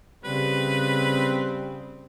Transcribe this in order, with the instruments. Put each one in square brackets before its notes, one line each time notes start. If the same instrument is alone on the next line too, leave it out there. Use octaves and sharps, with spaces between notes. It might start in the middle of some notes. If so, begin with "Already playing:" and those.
[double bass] C#3 [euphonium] G3 [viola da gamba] C4 [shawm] B4